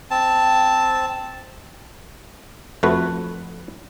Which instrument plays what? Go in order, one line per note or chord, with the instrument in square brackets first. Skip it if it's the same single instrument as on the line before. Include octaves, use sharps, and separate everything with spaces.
[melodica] C4 A5
[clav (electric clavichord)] F2 A3 F#4 B4